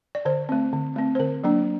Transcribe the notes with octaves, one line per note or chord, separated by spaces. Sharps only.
D5
D3 C5
A3 C4
D3
A3 C4
C5
D3 A#4
F#3 A#3 D4